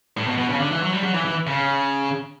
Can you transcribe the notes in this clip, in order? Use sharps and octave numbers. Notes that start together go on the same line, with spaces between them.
A2
B2
B2
C#3
D3
E3
F#3
G3
F#3
E3
E3
C#3